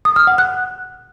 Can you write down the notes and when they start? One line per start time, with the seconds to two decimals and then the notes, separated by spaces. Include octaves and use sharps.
0.05 D#6
0.16 F6
0.27 F#5
0.38 F#6